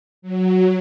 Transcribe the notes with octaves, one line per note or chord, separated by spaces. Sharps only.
F#3